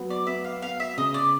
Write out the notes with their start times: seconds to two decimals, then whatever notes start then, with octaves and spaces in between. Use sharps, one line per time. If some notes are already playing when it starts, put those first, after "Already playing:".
Already playing: F#3 B3
0.10 D5
0.27 B3 E5
0.44 F5
0.62 B3 F5
0.80 E5
0.98 C#3 D#5
1.14 D5